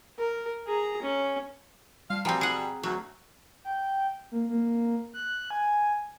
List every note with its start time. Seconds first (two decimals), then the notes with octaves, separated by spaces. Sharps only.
0.19 A#4
0.67 G#4 A#5
1.02 C#4
2.10 F3 G3 F5
2.25 B2 F3 G3 C4 G5 G#5 A#5
2.41 G#4 F#5
2.83 D2 F#3
3.65 G5
4.32 A#3
4.49 A#3
5.14 F#6
5.50 G#5